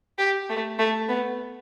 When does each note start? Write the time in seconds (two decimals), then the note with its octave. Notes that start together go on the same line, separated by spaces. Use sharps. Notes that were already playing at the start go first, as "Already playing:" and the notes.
0.19 G4
0.49 A3
0.79 A3
1.09 B3